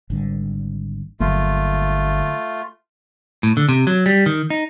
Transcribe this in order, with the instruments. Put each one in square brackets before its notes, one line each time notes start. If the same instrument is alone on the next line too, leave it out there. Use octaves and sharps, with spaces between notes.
[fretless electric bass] G#1 D3 G3
[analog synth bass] G1 [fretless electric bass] D3 F#3 A#3 [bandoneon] A3 F4
[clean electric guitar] A2
D3
C3
F#3
G3
D#3
D#4